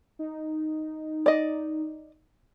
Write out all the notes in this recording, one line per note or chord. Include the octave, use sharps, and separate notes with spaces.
D#4
D5 D#5